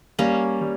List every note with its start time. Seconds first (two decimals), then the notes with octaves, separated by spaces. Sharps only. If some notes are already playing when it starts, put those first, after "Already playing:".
0.19 G3 A#3 C#4
0.61 G3